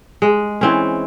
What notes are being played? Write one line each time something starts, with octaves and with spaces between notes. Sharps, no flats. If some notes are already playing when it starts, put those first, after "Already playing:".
G#3
E3 C4 C#4